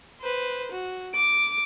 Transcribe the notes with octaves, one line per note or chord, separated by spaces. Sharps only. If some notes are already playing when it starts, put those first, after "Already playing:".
B4 C5
F#4
D6 D7